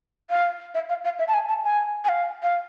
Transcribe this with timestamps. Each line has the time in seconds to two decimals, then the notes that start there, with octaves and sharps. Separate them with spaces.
0.30 F5
0.75 E5
0.89 F5
1.04 F5
1.19 E5
1.28 A5
1.34 G#5
1.49 A5
1.64 G#5
2.05 G#5
2.09 F5
2.43 F5